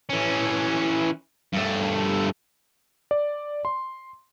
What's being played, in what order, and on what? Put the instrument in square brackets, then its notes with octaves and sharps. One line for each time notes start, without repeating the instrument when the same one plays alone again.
[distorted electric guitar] E3 C#4
G2 A3
[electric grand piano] D5
C6